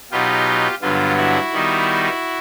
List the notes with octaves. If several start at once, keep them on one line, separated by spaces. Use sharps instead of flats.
B2 F#3 B3 D#4 F4 G4
G2 D3 F#3 B3 F4
E4 F#4
D#3 G3 B3 D#4